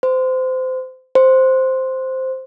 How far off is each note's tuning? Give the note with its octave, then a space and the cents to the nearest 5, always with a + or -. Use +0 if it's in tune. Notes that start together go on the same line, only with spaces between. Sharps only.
C5 -25
C5 +0